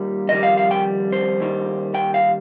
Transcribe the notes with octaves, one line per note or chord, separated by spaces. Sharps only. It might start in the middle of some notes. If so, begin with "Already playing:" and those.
Already playing: D#2 D#3 G3
F2 D#3 G3 D#5
F5
F5
G5
C5
D#2 D#3 G3
G5
F5